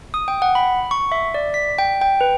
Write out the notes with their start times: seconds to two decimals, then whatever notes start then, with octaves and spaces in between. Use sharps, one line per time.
0.14 D#6
0.28 G5
0.42 F#5
0.55 B5
0.91 C#6
1.12 E5
1.34 D5
1.54 B6
1.79 G5
2.01 G5
2.21 B4